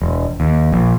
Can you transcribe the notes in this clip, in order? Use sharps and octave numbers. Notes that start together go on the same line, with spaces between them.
E1
D#2
A#1